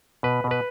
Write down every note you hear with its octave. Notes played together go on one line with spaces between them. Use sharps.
B2 B4
B2
B4